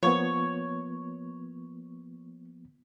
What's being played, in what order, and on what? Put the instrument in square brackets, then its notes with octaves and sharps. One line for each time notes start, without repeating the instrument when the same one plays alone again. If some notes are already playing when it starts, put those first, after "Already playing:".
[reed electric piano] F3 A#3 B3 [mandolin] C#5